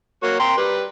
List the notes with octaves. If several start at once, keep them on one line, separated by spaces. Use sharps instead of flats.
A#3 F#4 C#5
G5 A#5 C6
G3 B4